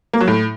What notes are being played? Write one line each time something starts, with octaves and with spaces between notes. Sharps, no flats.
A#3
F#3
A2